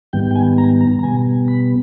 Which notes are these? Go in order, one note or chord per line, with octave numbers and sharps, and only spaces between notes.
G#2 D#3 G3 B3 G5
G5
G#5
A#5
A#5
A#5
B2 G3 B3 G#5
B5